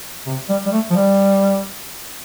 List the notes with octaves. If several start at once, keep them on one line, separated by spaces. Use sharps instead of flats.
C3
G3
G3
A3
F3
G3